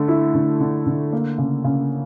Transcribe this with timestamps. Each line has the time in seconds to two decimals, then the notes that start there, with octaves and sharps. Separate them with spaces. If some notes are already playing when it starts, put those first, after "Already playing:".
Already playing: D3 A3
0.08 E4
0.34 D3
0.61 D3
0.86 D3
1.13 A#3
1.38 C#3
1.64 C#3